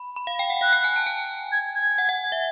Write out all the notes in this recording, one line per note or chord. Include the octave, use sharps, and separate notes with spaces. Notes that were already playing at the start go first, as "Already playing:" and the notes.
Already playing: B5
B5
F5
G5
F#5
F5 F#6
G5
G#5
A5
G#5
G#6
G#6
F#5
F#5
E5